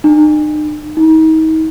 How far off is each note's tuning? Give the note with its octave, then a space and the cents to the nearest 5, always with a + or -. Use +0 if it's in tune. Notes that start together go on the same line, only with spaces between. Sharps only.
D#4 -45
D#4 +35